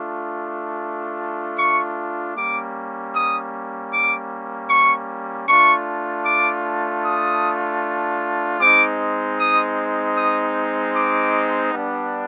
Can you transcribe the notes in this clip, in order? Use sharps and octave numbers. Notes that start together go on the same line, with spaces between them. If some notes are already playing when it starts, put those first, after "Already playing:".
Already playing: A3 D4 F4
C#6
G3 A#3 C#4 D6
D#6
D6
C#6
A3 D4 F4 C#6
D6
D#6
G#3 C4 D#4 D6
D#6
D#6
D6
G3 B3 D4